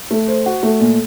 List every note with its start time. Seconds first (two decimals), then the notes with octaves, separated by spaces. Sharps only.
0.11 A3
0.28 C5
0.46 F#4
0.63 A3
0.80 A#2